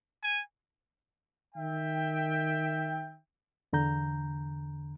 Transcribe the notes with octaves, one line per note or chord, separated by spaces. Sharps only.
G#5
D#3 E5 G5
E2 D3 A#5 G6